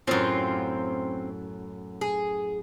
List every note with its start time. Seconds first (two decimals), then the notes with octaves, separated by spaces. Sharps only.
0.07 F#2 A2 C4 F4
2.01 G#4